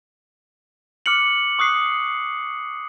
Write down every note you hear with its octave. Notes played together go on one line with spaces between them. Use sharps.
D6 F6 F#6 C#7 F#7
C#6 D#6 F#6 C7